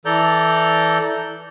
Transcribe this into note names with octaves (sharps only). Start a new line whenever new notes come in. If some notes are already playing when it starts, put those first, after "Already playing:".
E3 A4 D5 A#5 G6